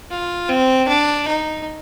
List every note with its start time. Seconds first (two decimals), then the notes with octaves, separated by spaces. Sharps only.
0.11 F4
0.49 C4
0.88 D4
1.28 D#4